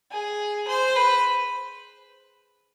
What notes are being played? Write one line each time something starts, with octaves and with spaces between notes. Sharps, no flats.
G#4
C5
B4